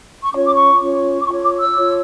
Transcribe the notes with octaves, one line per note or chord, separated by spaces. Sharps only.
C#6
C#4 F4 C#5 D6
D6
C#6
C#4 F4 C#5
D6
F4 A4 C#5 C#6
D6
E6
F4 A4 C#5